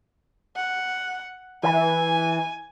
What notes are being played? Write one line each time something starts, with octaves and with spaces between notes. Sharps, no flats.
F#5
E3 G#5